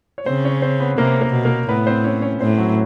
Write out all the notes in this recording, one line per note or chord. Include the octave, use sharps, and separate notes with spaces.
C#5
C#3 C4 C5
C#4 C#5
C4 C5
B3 B4
C3 A#3 A#4
A#3 A#4
B2
A#3 A#4
A2 B3 B4
C4 C5
C#4 C#5
C#4 C#5
A2 C4 C5
F#3 F#4